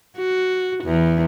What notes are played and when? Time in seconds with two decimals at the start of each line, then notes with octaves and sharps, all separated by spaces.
0.18 F#4
0.84 E2